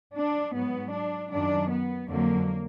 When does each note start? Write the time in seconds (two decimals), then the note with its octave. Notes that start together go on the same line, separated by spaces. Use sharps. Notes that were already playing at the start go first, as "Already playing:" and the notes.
0.13 D4
0.52 G#2 F#3 B3
0.91 D4
1.30 F#2 D#3 F#3 D4
1.69 B3
2.09 F2 D3 F#3 A#3